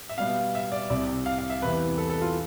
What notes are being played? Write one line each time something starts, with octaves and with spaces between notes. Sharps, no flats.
E5
B2 G3 B3 F5
E5
D5
C2 C3 G3 D5
F5
F5
E5
E2 C3 E3 B4
A4
A4
F4